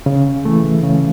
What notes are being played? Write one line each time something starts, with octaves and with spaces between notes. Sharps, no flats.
C#3
E3 A3
C#3